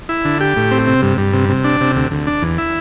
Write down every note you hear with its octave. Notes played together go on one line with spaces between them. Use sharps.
E4
D3
G4
A2
C4
C3
G2
G2
C3
C3
D4
C3
D2
D2
D4
E2
E4